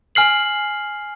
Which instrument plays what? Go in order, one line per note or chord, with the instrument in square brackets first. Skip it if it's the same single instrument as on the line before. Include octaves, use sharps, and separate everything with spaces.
[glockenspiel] G#5 F6 C7 F#7